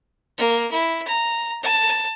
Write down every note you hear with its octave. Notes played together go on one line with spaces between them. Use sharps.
A#3
E4
A#5
A5